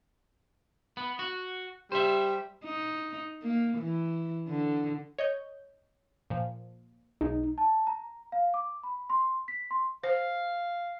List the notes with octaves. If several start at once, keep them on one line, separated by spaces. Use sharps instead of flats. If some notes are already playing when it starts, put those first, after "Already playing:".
B3
F#4
G3 C5 E5
D#4
A#3
E3
D3
C#5 D#5 G6
A#2 F3
B1 G#3 D#4
A5
A#5
F5
D6
B5
C6
B6
C6
C5 F5